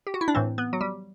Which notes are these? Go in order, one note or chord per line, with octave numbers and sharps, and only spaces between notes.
G4
F#4
E4
D4
A2 E3 C4
B3
F#3
G3